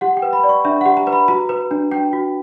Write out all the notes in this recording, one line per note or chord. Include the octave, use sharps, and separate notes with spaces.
G4 F#5
G5
B4
B5
D5
C#6
D4 E5
F#5
G4
A#5
B4
B5
F#4 A#5
B4
D4
D4 G5
F#4